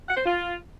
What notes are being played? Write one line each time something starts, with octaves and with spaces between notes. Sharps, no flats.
F#5
C5
F4